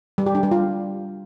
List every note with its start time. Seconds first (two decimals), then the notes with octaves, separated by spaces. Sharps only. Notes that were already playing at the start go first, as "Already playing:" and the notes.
0.18 G3
0.26 G4
0.35 D4
0.43 G3
0.51 F4